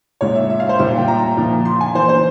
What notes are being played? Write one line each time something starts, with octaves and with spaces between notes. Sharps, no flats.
A#2 G#3 C#5
E5
E5
F5
C5
A#2 G3 A#3 E5
F5
G5
A#5
A#2 F3 A#3
C6
G#5
E3 A#3 C5
C5